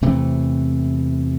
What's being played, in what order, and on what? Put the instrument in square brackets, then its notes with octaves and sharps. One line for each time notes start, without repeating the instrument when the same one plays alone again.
[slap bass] E2 C3 E3 A3